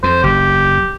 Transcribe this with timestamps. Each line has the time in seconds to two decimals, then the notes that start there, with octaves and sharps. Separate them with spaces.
0.03 F2 C5
0.23 F#1 G4